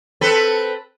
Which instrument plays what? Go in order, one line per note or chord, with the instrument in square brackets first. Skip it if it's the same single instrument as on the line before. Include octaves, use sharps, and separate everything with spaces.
[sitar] C4 A4 B4